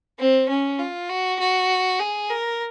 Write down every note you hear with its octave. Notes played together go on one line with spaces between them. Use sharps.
C4
C#4
F4
F#4
F#4
G#4
A#4